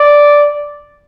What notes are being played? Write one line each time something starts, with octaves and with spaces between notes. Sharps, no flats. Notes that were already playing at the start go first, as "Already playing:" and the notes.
Already playing: D5